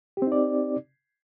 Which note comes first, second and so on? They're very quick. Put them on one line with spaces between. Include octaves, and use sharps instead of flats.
G4 C4 D#4 D5